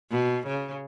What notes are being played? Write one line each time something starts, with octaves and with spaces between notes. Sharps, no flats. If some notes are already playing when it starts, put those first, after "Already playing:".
B2
C#3